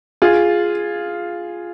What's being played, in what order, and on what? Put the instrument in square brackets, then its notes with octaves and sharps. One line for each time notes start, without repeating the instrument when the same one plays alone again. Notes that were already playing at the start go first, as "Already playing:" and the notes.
[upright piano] F4 G#4